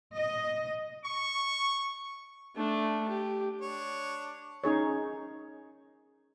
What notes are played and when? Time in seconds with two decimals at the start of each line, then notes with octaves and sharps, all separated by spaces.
0.15 D#5
1.04 C#6
2.56 A3 D4
3.08 G4
3.61 D4 C#5
4.64 C#4 D#4 G#4 C#5